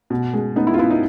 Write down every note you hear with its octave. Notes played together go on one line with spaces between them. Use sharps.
B2
G#3
B3 D#4
E4
F4
B3 E4
D#4